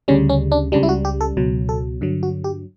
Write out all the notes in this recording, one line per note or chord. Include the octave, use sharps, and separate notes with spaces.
D2 C#3 G3 C#4
C#4
D4
C#2 C#3 G3 D4
E4
F#4
G4
A4
C#2 B2 F#3
A4
G2 D3 F#3
F#4
G4